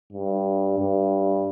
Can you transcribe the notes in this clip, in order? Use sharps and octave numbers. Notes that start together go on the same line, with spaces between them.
G2
G2